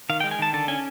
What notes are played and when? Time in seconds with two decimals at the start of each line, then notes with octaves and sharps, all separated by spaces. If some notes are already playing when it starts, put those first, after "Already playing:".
0.09 D#3 F5
0.20 G5
0.24 G#3
0.31 G#5
0.39 D#3 A5
0.53 D3 A5
0.68 C#4 G#5